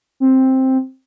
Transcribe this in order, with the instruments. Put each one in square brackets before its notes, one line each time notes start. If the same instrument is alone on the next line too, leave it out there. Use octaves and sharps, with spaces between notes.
[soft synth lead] C4